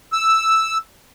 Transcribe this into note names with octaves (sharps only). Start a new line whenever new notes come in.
E6